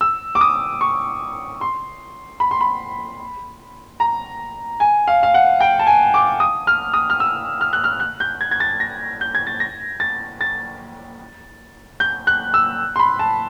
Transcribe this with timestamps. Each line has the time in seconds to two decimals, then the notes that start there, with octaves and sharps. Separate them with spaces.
0.01 E6
0.35 D6
0.41 D#6
0.81 C#6
1.61 C6
2.40 B5
2.51 C6
2.61 B5
4.00 A#5
4.80 G#5
5.08 F5
5.23 F5
5.34 F#5
5.60 G5
5.79 A5
5.87 G#5
6.14 D6
6.40 D#6
6.67 F6
6.94 D#6
7.10 F6
7.20 E6
7.61 F6
7.73 F#6
7.84 F6
8.00 F#6
8.20 G6
8.41 G#6
8.51 G#6
8.60 A6
8.80 A#6
9.21 G6
9.35 G#6
9.47 A6
9.60 A#6
10.00 A6
10.41 A6
12.00 G6
12.27 F#6
12.54 E6
12.96 C6
12.99 B5
13.19 A5